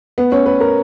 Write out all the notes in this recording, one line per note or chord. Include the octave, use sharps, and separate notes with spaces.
B3
C#4
B4
A#4